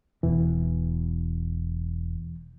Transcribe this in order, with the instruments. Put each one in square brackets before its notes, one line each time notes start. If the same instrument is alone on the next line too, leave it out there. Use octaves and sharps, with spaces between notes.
[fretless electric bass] E1 B2 [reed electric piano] E3